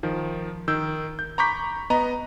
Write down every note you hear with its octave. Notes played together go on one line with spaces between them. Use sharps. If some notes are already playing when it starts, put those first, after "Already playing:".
D#3 F3
D#3 E6 G6
G6
A#5 B5 C#6 D6 G6 B6
B3 D#5 A#5